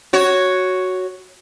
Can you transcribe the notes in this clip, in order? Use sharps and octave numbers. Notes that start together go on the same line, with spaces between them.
F#4 C#5